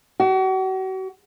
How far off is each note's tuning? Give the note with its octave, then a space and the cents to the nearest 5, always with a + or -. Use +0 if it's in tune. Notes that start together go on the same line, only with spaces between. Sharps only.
F#4 +40